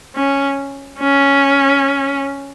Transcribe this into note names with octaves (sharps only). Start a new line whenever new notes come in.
C#4
C#4